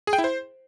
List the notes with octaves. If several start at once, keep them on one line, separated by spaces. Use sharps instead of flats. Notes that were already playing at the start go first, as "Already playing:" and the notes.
G#4
G5
E4
C5